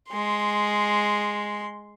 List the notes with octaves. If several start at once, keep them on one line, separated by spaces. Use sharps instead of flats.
G#3 C6